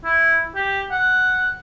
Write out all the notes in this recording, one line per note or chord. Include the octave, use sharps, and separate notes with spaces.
E4
G4
F#5